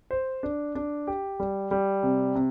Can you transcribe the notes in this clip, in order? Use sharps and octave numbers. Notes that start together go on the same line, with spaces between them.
C5
D4
D4
G4
G3
G3
C3
C3